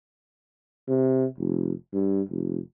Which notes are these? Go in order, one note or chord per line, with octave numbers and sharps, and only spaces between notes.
C3
F1
G2
F1